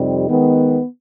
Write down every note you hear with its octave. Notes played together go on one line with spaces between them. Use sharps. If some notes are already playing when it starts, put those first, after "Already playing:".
Already playing: F2 C3 G3 C4 D#4
D#3 G#3 B3